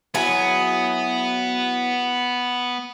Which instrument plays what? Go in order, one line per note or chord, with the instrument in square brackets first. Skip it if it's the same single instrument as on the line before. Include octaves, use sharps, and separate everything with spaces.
[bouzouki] F#3 E4 G#4 [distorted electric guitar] B3